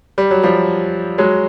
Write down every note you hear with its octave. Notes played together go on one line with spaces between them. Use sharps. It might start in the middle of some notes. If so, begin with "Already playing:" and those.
G3
F#3
F3 G3
F#3 G#3